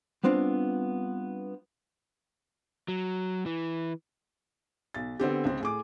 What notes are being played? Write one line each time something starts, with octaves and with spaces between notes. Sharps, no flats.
G3 B3 C4 D4 F4
F#3
E3
B1 A6
D3 B3 C4 G4
C#2 C4
A2 G#4 D6